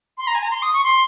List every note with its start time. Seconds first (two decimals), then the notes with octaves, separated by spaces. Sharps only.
0.18 C6
0.27 A#5
0.35 G#5
0.43 A#5
0.51 C6
0.62 D#6
0.73 C#6
0.84 C6